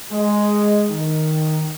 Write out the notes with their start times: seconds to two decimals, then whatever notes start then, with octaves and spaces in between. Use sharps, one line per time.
0.12 G#3
0.90 D#3